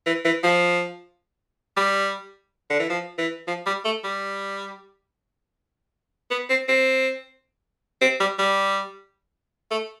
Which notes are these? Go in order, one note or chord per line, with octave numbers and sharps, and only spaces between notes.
E3
E3
F3
G3
D3
E3
F3
E3
F3
G3
A3
G3
B3
C4
C4
C4
G3
G3
A3